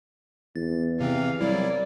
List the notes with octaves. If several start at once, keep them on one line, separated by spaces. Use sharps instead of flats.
E2 A6
C3 E3 C4 F5
C2 F#3 G3 E4 D5